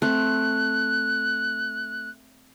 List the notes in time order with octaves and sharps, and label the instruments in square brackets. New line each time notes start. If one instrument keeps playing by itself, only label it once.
[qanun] A3 C4 [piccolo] F#6